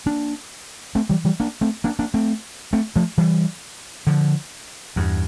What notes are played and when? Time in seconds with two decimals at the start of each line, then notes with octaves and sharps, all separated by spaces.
0.06 A#3 D4
0.95 A3 C4
1.09 E3 G3
1.24 E3 G3
1.40 A#3 D4
1.61 A3 C4
1.84 A#3 D4
1.99 A#3 D4
2.14 A3 C4
2.73 A3 C4
2.96 F3 A3
3.18 E3 G3
4.07 D3 F3
4.96 E2 G2